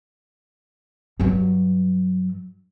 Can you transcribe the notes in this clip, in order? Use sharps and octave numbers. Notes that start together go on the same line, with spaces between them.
G2 F#3